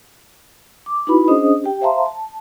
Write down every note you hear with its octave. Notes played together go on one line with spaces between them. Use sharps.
D6
D#4 E4 F#4 B4 B5
C#4 D4 G#4 C5 D#5 D#6
G4 G5
C5 E5 F5 A5 A#5 C6
A5